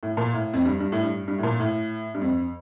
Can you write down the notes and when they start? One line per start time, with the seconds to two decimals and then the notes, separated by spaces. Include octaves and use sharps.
0.03 A2
0.17 A#2
0.33 A2
0.54 F2
0.65 G2
0.80 G2
0.92 A2
1.03 G2
1.28 G2
1.38 A2
1.43 A#2
1.60 A2
2.14 G2
2.21 F2